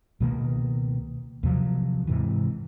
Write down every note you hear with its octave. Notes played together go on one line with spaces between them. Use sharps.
C#2 B2 D#3 A#3
D#2 C3 F3 F#3
G#2 C3 E3